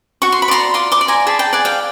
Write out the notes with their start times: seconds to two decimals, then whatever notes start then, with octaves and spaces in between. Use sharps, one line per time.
0.22 F#4 C#6
0.32 C6
0.42 B5
0.48 D5 A#5 C6
0.74 F4 C6 D6
0.92 C6 D6
1.01 D5
1.08 G#5 A#5
1.27 G#4 A5 B5
1.39 G5 A5
1.53 D5 F#5 G#5
1.65 F5 G5